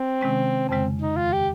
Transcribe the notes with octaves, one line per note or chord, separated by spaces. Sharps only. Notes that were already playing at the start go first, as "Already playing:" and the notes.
Already playing: C4
C3 D#3 G#3 C#4
F2 C#3 G#3 C4
D#4
D#2 D#3 G#3 F4
G4